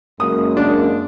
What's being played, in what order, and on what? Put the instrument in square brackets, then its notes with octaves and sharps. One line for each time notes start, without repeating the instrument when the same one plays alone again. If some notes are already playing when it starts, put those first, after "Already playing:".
[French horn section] F#2 G#3 A#3 [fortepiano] D#6
[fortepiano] D4